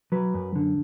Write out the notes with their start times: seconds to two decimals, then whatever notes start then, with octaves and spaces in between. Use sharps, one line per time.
0.12 F#3 B4
0.34 F#2
0.56 D3